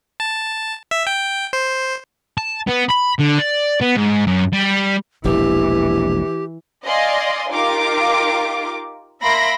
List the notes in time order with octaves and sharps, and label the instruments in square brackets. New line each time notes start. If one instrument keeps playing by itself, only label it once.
[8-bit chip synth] A5
E5
G5
C5
[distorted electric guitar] A5
B3
B5
D3
D5
B3
G#2
F#2
G3
[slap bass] E1 A#1 [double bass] E3 [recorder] G4
[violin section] D5 D#5 F5 G#5 C6
D#4 F4 G4 A#4 D6
A#3 E5 B5 C6 A#6 D7